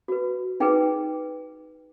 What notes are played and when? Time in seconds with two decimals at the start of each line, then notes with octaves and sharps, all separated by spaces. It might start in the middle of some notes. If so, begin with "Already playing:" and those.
0.08 F#4 B4
0.60 D#4 G#4 B4 G5